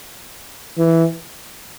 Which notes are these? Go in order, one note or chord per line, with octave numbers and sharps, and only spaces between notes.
E3